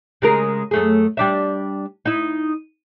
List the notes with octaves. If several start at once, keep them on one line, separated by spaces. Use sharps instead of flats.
C#3 G#3 A#4
F#2 A3 G#4
G3 D4 E5
D#4 E4